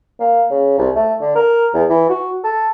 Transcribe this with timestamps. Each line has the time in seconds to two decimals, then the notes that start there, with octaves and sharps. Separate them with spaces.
0.20 A#3
0.50 C#3
0.78 C2
0.96 A3
1.21 D3
1.35 A#4
1.74 E2
1.89 E3
2.10 F#4
2.44 A4